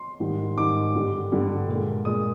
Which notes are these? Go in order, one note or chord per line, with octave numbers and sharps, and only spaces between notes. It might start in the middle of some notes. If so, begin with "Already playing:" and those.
Already playing: C6
G#2 D#3 G3
G#2 D#3 G3 D6
G2 D3 G3
G2 D3 G3
A#2 G#3
A#2 G#3 D#6